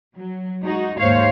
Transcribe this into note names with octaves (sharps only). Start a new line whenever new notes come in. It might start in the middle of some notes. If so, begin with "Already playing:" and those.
F#3
G#3 D#4 F#4
D#2 G#2 C5 C#5 F5